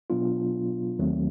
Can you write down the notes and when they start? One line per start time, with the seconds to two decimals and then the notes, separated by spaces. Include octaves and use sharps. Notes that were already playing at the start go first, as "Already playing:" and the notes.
0.10 B2 F#3 B3 D4 F4
0.99 D#2 D#3 F#3 A3 C4